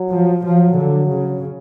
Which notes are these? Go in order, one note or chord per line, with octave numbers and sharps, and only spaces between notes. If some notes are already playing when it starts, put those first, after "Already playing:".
Already playing: F#3
F3
F3 F#3
D3
C#3